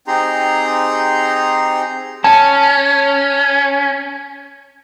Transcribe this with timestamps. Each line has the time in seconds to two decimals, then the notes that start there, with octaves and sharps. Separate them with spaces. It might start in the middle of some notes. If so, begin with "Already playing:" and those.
0.08 C4 D#4 G4 G#4 A#5 C6
2.24 C#4 A5